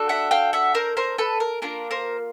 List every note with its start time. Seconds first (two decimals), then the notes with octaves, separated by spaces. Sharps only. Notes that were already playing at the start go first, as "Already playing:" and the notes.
Already playing: D4 F#4 A4
0.09 E5 F#5
0.31 F5 G5
0.53 E5 F#5
0.75 A#4 C5
0.97 A#4 C5
1.18 A4 B4
1.40 A#4
1.62 A#3 D4 F4 A#4
1.91 A#4 C5